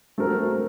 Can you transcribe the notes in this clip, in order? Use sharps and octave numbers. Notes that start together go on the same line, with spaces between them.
A3 C4 F#4 A#4